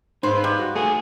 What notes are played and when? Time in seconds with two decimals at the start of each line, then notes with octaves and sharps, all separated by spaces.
0.23 G#2 D#4 B4 C5 F5
0.44 G3
0.59 F#4
0.75 A3 G#4 A4 F#5 G#5